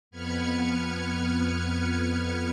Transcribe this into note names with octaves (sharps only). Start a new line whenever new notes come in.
F2 B3 B4 F6 G#6 C#7